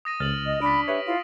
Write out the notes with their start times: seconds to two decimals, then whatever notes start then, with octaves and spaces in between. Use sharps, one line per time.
0.05 D#6 A#6 D#7
0.20 C#2 F6 A6 F#7
0.46 D#5
0.62 D4 B5 B6 D7
0.88 G4 B4 C#5 E5
1.06 E4 F4